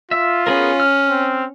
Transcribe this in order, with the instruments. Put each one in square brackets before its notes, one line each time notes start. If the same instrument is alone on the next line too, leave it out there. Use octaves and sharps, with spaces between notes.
[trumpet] F4 [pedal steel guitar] E5
[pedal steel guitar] B3 G#4 A#4 [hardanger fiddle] C#4
[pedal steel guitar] F6
[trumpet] C4